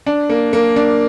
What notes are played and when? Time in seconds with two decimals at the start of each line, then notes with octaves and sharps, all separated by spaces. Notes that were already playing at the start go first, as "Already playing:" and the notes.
0.06 D4
0.30 A#3
0.53 A#3
0.76 D4